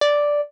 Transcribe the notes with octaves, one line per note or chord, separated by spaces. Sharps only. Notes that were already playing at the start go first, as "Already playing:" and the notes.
D5